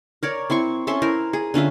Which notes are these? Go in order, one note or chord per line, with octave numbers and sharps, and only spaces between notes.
A#4 C#5 D5
C4 E4 C6 C#6
C#4 A4 E5 C6
E4 A#4 C5
G#4
D3 C#4 F4 E5